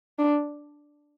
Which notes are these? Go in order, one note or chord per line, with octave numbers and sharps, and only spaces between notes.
D4